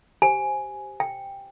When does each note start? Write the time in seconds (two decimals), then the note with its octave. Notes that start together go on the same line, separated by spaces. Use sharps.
0.22 G4 C5 G#5
1.00 G5